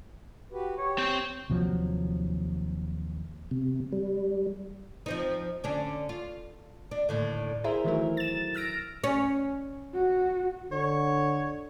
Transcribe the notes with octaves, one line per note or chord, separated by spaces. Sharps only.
F#4 G4 B4
G4 C#5
C4 G5
D#2 C3 F3 F#3
C3
G3
F3 C4 D#4
D3 C#4 D4
F4
D4
D#2 A2 D3
E4 G#4 A#4 C5 E5
D#3 E3 F#3 A3 E4 A#4
A6 E7
E6 F6 A#6 D7
C#4
F#4
D3 C#5